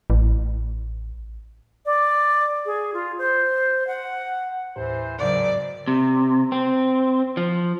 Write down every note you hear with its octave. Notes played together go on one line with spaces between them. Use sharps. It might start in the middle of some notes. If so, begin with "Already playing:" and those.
A1
D5
G#4
F4
C5
F#5
D#2 A2 E3 C5
G#1 G#2 C#3 F#3 D5
C3
C4
F3